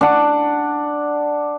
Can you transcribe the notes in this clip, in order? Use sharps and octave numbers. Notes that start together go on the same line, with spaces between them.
D4 F#5